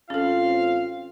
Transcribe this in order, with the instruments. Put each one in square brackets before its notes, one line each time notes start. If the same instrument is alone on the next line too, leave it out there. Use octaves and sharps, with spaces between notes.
[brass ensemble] A1 C4 F4 [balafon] C#4 A4 [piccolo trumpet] F5